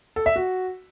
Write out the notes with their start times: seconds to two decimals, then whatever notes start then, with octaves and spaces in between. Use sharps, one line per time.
0.16 A4
0.26 E5
0.36 F#4